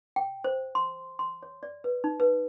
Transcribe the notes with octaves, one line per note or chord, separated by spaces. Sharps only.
G5
C5
C6
C6
C#5
D5
B4
D#4
B4